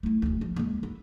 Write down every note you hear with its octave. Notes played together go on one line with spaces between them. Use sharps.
A3 E4
E1 D2
F3
D#2 G#3
E4